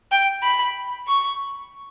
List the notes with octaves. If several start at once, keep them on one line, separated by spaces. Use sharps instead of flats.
G5
B5
C#6